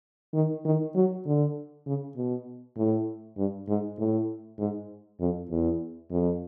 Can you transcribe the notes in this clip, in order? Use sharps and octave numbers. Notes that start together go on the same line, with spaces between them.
D#3
D#3
F#3
D3
C#3
B2
A2
G2
G#2
A2
G#2
F2
E2
F2